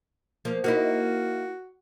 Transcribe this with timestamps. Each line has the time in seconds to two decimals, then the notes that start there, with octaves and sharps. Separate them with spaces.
0.45 F3 A#3
0.64 A#3 D#4 E4 F#4